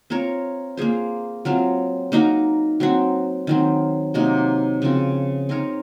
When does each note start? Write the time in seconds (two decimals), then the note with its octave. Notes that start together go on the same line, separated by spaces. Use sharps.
0.10 C4 F4 A#4 C#5
0.77 A#3 F4 G#4 C5
1.45 F#3 C4 F4
2.12 A#3 D#4 F#4 A#4
2.80 F#3 C4 F#4
3.47 D#3 F#3 C4
4.14 C3 F#3 A#3 D#4
4.82 C#3 F3 C4 F#4
5.49 C4 D#4 A#4 C#5